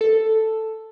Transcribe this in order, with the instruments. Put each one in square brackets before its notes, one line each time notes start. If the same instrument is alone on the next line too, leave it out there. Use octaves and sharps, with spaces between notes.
[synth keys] A4